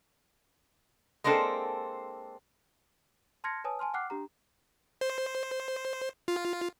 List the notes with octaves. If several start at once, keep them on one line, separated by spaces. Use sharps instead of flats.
G#3 A#3 C4 D4 A4
A5 C6 F6 G#6 A#6 C#7
B4 C#5 G#5 A5 D#6
G#5 A5 C6 F6
F#5 G5 D6 F6 F#6 C7
D4 G4 A#5
C5
F4